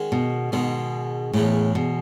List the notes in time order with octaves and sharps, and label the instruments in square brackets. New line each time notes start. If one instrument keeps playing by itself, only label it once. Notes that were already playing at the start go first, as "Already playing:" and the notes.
Already playing: [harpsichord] D#3 G#3 C#4 F#4
[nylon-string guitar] B2
[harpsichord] G#2 D#3 G#3 [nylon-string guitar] B2
[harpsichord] E2 C#3 G#3 C#4 [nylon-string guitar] A2
[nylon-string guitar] B2